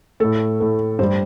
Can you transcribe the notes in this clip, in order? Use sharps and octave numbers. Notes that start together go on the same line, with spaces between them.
A2 A3 A4
A2 A3
G2 G3 C5